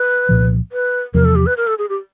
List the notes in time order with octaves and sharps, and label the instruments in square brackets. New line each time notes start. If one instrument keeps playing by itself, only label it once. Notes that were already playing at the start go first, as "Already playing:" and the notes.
Already playing: [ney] B4
[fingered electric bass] C2 A#2 F3
[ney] B4
[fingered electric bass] E2 C3 F3 [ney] A#4
[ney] A4
G4
B4
A#4
A4
G#4
G4